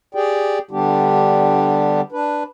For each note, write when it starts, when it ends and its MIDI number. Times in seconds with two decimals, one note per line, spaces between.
0.15 0.59 67
0.15 0.59 68
0.15 0.59 74
0.15 0.59 79
0.71 2.01 50
0.71 2.01 55
0.71 2.01 59
0.71 2.01 62
0.71 2.01 67
2.12 2.43 62
2.12 2.43 71